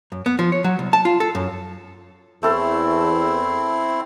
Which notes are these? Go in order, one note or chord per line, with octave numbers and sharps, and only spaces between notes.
F#2
B3
F3
C#5
F#3
C2
A5
F4
A4
F#2
E2 A3 C4 E4 A4